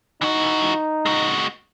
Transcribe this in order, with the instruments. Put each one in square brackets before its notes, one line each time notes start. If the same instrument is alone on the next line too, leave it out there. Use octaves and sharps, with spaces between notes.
[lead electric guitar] E3 F#4 [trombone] D#4
[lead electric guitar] G#3 F#4